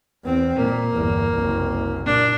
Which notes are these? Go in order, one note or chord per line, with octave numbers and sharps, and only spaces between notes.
E2 C4
A#2 A#3
G1 E2
F#1 C2
A#2 D4